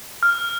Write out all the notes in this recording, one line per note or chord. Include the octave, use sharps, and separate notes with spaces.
F6